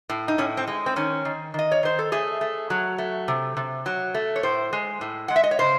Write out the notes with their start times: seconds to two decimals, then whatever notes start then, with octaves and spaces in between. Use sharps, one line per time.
0.09 A2
0.28 D#4
0.38 A2 C#4
0.57 C4
0.67 G#3
0.86 C4
0.96 D#3 C#4
1.25 D#3
1.54 D#3 D#5
1.72 C#5
1.83 D#3 C5
1.99 A4
2.12 A3 G#4
2.41 A3
2.70 F#3
2.98 A3
3.28 C3
3.57 C3
3.86 F#3
4.14 A3
4.36 C#5
4.43 A2 C5
4.73 G#3
5.01 A2
5.28 G#3 F#5
5.36 E5
5.44 D#5
5.51 C#5
5.59 C#3 C5